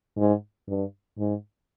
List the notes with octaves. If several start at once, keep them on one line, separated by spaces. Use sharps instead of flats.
G#2
G2
G#2